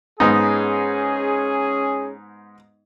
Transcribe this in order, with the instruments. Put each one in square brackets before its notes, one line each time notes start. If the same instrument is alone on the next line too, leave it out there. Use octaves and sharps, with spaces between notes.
[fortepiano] G#2 B3 D#4 [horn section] C#4 G#4